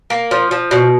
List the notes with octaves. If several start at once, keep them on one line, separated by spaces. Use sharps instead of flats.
A#3
F3
F3
B2